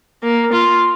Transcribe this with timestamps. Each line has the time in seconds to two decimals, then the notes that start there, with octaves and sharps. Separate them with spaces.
0.23 A#3
0.53 F4